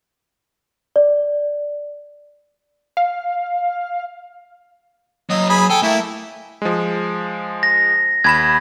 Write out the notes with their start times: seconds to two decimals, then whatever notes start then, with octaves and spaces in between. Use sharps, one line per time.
0.96 D5
2.97 F5
5.30 F#3 A#3 D#5
5.49 G#4 B5
5.70 A4 G5 G#5
5.83 A3 A#3 E4
6.62 F3 G#3
7.63 A#6
8.24 D#2 B5 G#6 E7